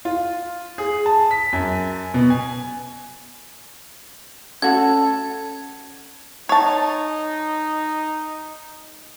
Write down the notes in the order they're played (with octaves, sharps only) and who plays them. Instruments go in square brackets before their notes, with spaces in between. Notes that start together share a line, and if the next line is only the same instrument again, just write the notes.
[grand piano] F4
G#4
A5
B6
F#2
B2
G#5
[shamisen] A3 F#4 B5 [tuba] C#4 [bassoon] A4 [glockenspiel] G#6
[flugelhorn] D#4 [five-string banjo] C#5 A5